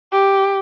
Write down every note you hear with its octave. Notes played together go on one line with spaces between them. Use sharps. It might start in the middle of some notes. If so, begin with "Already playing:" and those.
G4